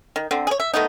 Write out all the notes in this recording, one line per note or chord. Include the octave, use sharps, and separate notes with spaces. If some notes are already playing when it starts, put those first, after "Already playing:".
D#3
D3 C4
G#4 C#5
E5
D#3 A3 B3 D#4